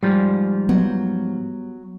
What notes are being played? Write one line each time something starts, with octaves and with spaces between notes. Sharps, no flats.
G#2 F3 G3
F#3 B3